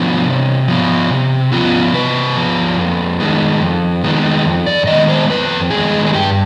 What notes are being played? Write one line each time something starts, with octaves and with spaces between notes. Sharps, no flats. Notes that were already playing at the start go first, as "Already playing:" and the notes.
Already playing: F3 B3 D4
C3
F3 B3
C3
F3 B3 F4
C3 B4
F3 B3
F2
D#3 G#3 B3
F2
D#3 G#3 B3
F2
D5
D#3 G#3 B3 D#5
C5
F2 B4
D#3 G#3 B3 G#4
G#4
G2 G4